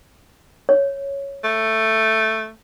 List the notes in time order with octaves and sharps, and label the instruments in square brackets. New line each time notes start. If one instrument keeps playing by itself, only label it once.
[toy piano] C#5
[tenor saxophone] A3